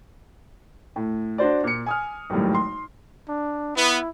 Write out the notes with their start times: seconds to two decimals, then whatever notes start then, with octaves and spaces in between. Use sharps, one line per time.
0.96 A2
1.38 D4 F#4 C5 D5
1.64 A#2 C#7
1.86 G#5 D#6 F6
2.30 G#1 F#2 A2 G3
2.55 C6
3.29 D4
3.76 B3 E4